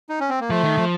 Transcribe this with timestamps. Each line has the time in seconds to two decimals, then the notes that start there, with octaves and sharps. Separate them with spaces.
0.09 D#4
0.20 C#4
0.30 C4
0.40 A#3
0.49 F3 A3
0.64 D#3
0.78 F3